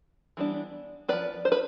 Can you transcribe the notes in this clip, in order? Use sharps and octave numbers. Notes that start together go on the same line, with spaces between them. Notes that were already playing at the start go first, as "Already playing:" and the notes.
E3 G3 B3 D4
F3 C4 B4 D5
C5
B4